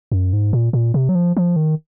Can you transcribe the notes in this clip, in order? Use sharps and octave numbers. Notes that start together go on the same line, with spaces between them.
F#2
G#2
A#2
A#2
C3
F#3
F3
F3
D#3